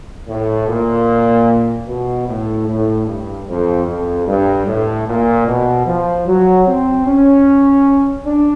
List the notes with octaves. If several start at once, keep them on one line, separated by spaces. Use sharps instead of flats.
A2
A#2
B2
A2
A2
G2
F2
F2
G2
A2
A#2
B2
F3
F#3
C4
C#4
D4